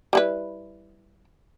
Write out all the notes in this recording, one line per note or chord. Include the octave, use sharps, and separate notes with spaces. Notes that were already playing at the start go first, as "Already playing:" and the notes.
G3 E4 B4